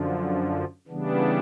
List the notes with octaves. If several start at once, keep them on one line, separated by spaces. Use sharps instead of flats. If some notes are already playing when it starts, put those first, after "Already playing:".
Already playing: F#2 D3 F3
C#3 E3 G3 B3 D4